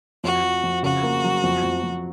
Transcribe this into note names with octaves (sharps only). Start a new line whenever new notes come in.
F2 F#4
F3
F2
C#3 F#4
A#3
F#3
F2
F2
F2